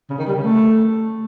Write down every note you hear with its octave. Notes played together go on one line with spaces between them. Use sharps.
C#3
D#3
G3
C#3
A3